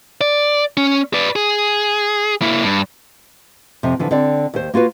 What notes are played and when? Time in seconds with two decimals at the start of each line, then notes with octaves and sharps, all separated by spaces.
0.21 D5
0.77 C#4
1.14 B4 D5
1.36 G#4
2.42 A#3 E4
2.63 G2
3.83 F2 C3
3.99 D3 E3 F3
4.11 D3 C4 D5
4.54 D#2 C5
4.74 A#3 F4 F#4 B4